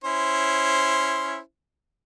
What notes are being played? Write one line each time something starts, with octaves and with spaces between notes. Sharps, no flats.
C#4 E4 C5